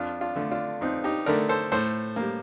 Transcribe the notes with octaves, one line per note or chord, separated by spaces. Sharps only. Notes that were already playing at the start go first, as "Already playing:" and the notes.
Already playing: F2 D4 F4
D4 F4
D3 A3
D4 F4
F2 C4 D#4
D#4 G4
D3 A3 A#4 D5
A4 C5
A2 A4 C5
G3 A#3